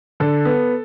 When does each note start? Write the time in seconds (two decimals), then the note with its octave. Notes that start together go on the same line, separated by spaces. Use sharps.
0.20 D3 A4
0.45 B3